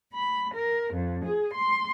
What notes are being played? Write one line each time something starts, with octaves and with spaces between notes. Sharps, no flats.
B5
A#4
F2
G#4
C6